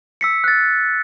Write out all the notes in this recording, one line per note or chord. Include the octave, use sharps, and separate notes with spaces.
E6 B6 C#7
F#6 A6